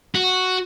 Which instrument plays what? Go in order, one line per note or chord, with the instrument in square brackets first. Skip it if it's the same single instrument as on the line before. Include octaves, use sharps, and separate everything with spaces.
[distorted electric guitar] F#4